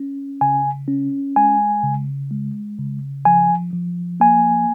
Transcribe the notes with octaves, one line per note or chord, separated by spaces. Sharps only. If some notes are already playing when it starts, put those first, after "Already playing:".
Already playing: C#4
C#3 G#5
C#4
G#3 G#5
C#3
G#3
C#3
F3 G#5
F3
A#3 G#5